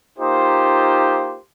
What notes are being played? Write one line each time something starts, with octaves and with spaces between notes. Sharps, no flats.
A#3 D#4 F4 G4 C5